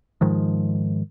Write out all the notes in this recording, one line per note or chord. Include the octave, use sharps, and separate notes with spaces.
G#2 D#3 F3 G#3